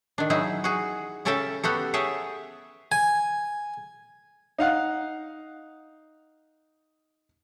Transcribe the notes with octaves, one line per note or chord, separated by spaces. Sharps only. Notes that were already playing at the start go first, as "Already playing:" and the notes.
D#3 D4
F#3 D#4 E4 G#4
F#4 G#4
C#3 C#4 A4 E5 G5 A5
B3 F#4 G4 A4
G#4 C#5 E5 G5 A5
G#5
D#4 F5 F#5